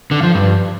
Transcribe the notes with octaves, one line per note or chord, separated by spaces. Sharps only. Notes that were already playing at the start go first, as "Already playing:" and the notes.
D3
F3
G2